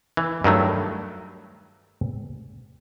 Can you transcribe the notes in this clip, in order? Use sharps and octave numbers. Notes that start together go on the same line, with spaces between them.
E3
G2 D#3 F#3 A3